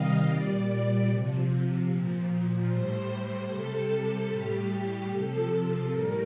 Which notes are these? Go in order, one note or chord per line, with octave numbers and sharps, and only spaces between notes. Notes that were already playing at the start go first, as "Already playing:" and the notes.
Already playing: C3 D#3 G3 D#5 F5
A#2 G3 D5
C3 F3
A#2 F3
A2 G3 C5
C3 G3 A4
A2 G3 G4
C3 F3 A4
A2 G3 A#4